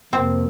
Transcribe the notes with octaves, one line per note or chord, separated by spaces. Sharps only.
F2 C3 F3 A#3 C4